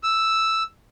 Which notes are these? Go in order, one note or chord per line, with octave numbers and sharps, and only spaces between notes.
E6